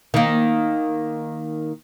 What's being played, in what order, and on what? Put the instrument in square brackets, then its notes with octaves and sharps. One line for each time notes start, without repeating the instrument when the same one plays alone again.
[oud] D#3 A#3